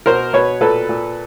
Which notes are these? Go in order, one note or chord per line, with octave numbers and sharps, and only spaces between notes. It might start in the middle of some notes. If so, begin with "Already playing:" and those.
B2 A#4 C5
B2 B4 C#5
A#2 A4 B4
A#2